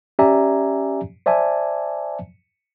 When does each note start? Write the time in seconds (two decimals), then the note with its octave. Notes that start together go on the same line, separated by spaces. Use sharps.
0.19 C#4 G4 D5 E5 G#5 A#5
1.26 C5 D5 E5 G#5 A5